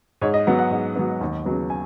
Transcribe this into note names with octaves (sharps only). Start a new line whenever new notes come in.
G#2 C#5
D#5
F#3 B3 F#5
F#5
G#2
F#3 B3
D#2
C#3 F#3 B3
G#5